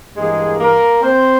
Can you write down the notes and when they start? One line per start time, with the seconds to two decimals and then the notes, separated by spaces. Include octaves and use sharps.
0.16 G2 E3 G#3 A#3 G#4
0.60 A#3 A#4
1.02 C4 C5